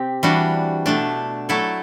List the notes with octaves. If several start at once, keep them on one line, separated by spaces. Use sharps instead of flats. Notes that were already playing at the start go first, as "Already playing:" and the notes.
Already playing: C3 C4 G4
E3 G3 D4 F#4
B2 A3 D4
F#3 A3 E4 A4